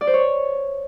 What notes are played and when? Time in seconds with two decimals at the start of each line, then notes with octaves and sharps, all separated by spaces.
0.01 D5
0.07 C5
0.14 C#5